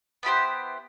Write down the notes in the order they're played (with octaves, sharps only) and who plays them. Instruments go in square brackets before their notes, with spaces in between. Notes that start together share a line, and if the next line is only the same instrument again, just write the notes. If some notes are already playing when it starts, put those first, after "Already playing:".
[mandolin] B3 E4 G4 C5